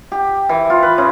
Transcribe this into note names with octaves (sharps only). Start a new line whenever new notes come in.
G4
E3
F4
B4
C#3